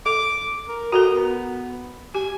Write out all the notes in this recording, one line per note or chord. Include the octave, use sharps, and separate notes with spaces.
A4 D6
A#4
F#4 A4 A#4 A#5
B3
G4 G#5